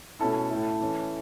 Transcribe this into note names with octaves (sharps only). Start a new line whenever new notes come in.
B2 A3 C#4 E4 A4
A2 A3 E4
E3 A3 C#4